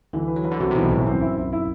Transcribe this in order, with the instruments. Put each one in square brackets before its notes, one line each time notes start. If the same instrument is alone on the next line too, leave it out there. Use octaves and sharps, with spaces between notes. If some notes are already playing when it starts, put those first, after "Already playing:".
[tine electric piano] D2 D3 [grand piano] E3
[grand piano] B4
[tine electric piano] F#3
[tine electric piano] E3 [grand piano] B4
[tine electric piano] D3
[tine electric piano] C2 C3 [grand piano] F#4
[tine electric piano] C3
[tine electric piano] B1 B2 [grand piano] E3
[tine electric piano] A1 A2 [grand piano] E3
[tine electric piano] F#2 [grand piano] C4
[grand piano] E4
E4
E4